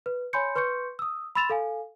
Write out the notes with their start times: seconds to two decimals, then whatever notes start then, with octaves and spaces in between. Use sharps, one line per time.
0.06 B4
0.33 C#5 G#5 B5 C6 G6 C#7
0.56 B4 C6 C#6 G6 C#7
0.99 D#6 E6
1.35 B5 C6 E6 A6 E7 F7
1.50 A4 F5 G#5